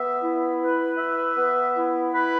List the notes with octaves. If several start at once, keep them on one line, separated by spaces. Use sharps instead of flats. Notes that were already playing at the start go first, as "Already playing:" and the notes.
Already playing: B3 E5
E4
B4
E5
B3
E4
B4